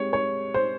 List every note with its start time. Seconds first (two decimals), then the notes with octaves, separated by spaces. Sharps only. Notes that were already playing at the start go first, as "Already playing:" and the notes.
Already playing: G#3 C4 G4 C#5
0.13 C#5
0.54 C5